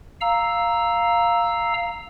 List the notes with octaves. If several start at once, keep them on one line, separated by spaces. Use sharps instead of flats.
F5 A#5 E6